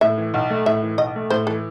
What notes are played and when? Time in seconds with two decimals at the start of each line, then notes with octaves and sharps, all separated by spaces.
0.01 A2 E5
0.18 E3
0.34 B1
0.50 A3
0.66 A2 E5
0.83 E3
0.98 B1 D#5
1.15 A3
1.30 A2 C5
1.47 E3 A4